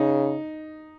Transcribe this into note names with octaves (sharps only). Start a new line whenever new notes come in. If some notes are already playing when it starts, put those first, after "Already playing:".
Already playing: C#3 D#4